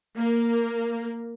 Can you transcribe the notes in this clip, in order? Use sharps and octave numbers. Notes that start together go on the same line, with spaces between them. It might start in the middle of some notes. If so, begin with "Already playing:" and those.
A#3